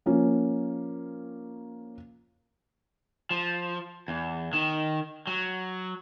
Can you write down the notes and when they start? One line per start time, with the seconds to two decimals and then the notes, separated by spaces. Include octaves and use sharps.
0.06 F3 A#3 C#4
3.31 F3
4.08 E2
4.53 D#3
5.27 F#3